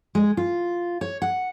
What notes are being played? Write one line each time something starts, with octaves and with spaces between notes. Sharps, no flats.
G#3
F4
C#5
F#5